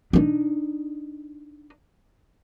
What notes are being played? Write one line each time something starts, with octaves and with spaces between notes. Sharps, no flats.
D4 D#4